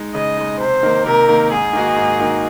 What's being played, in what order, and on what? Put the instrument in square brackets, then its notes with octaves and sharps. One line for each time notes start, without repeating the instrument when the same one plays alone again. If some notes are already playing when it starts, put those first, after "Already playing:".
Already playing: [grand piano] G#3 D#4
[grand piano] C#3 [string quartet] D#5
[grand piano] G#3 D#4
[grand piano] C3 [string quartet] C5
[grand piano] D#3 A#3
[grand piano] C3 [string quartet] A#4
[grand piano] D#3 A#3
[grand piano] G#2 [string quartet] G#4
[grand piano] D#3 A#3 D#4 F#4
G#2
D#3 A#3 D#4 F#4